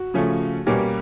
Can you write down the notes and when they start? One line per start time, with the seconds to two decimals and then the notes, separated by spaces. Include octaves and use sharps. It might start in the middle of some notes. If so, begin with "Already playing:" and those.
Already playing: F#4
0.14 C#3 F3 A3 C#4
0.66 B2 G3 A#3 C#4 G4